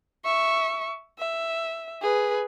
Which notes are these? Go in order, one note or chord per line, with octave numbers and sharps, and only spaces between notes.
E5 C#6
E5
G#4 B4